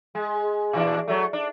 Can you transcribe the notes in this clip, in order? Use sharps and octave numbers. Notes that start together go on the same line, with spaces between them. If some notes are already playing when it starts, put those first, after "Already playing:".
G#3
A#2 E3 D4
F#3 A3
D4